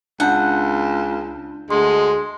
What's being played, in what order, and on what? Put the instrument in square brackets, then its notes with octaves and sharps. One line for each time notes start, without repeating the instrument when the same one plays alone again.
[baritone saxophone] C#2 [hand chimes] D4 A5 G6 [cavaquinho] F#5
[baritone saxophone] D2 [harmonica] G#3 [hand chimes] C6